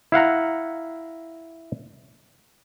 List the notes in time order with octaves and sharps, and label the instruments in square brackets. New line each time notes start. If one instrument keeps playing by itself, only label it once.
[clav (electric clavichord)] E4 F5 F#5 A#5